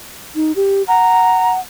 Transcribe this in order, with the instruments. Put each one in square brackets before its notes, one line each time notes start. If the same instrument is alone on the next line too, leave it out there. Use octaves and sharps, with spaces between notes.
[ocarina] D#4
G4
[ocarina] F#5 [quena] A#5